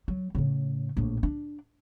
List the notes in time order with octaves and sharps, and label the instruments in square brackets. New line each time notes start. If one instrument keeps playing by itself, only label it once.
[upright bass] F#3
A2 C#3
A#1 A2
D4